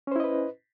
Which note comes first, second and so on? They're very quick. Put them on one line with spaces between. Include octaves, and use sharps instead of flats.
C#4 C5 E4 D#5 B4